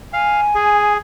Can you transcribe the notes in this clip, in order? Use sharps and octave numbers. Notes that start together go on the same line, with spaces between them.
F5 G#5
G#4